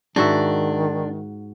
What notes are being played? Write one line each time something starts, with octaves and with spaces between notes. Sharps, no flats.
G#2 D#3 D4 F#4 E5